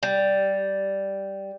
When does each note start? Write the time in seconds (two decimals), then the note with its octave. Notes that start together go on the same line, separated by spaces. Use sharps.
0.03 G3